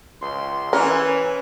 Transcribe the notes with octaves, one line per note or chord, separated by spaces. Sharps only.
C#2 C6
E3 C#4 A#4